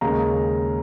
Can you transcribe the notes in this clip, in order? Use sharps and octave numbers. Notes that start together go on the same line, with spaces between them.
D#2 C#3 G#3 C#4 A#5